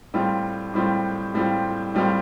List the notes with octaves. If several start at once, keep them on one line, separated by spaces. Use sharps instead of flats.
A2 G3 C4 F4
A2 G3 C4 F4
A2 G3 C4 F4
A2 G3 C4 F4